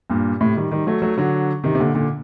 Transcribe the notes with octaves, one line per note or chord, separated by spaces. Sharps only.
G2 A#2
A2 C3
D#3 G3
D#3 G3
F#3 A3
F#3 A3
D3 F#3
C3 D#3
C3
A#2 D3
A#2 D3